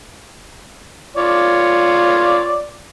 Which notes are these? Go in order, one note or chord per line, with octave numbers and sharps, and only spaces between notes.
F4 C#5 D5